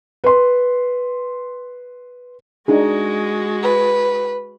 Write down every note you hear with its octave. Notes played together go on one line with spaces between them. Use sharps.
B4 C6
G#3 D4 D#4 F#4 G#4
B4